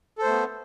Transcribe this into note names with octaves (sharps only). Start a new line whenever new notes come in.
A3 B3 A4 C5